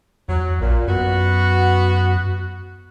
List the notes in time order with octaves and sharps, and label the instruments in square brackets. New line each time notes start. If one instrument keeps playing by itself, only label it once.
[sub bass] E2 [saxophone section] F#3
[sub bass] A#1 [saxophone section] A#2
[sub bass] F#2 [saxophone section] B3 F#4